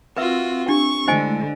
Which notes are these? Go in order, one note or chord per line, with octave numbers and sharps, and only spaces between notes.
C4 F4 F#4 A#4 B4 E5 E6
D4 G4 C#6
D3 G#3 A3 E4 C5 D#5 G#5